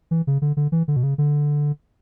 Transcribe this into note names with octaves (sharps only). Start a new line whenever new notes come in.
E3
C#3
D3
D3
E3
D3
B2
C#3
D3